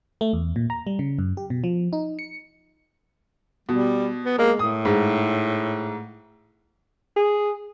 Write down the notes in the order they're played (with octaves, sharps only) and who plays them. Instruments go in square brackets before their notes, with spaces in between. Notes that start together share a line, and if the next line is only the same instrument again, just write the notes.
[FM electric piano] A3
E2
A#2
A#5
G3
C#3
F#2
G4
B2
F3
D#4
C#7
[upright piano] B2 [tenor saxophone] G3
[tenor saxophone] B3
[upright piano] G#3 [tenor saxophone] A#3
[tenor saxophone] A2 [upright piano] D#6
[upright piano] G#2
[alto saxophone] G#4